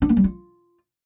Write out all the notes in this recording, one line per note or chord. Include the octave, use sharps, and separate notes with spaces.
D4
A#3
G3
F4